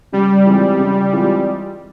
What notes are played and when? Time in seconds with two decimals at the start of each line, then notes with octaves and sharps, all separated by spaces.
0.12 C#3 G3
0.46 E3 G#3 C4 F4
0.79 C#3
1.12 E3 G#3 C4 F4